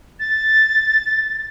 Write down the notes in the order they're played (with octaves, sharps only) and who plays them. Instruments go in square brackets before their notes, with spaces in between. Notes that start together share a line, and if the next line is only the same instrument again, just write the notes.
[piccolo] A6